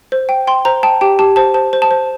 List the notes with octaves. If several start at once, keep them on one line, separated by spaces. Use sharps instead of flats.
C5
G5
G5 C6
C5 A#5
G5 A5
G4 G5
G4 A5
C5 A5
C5 A5
C5
A5
C5